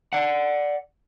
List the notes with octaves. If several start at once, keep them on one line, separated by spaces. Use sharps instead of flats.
D5 F#5